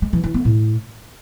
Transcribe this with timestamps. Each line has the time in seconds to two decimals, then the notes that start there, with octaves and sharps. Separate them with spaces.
0.02 G#3
0.13 E3
0.24 E3
0.34 B3
0.45 A2